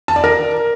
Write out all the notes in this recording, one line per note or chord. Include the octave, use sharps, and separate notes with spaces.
A5
D5
A#4